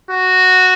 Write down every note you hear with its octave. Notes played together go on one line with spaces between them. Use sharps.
F#4